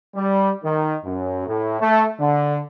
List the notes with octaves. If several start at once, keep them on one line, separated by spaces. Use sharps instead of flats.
G3
D#3
F#2
A2
A3
D3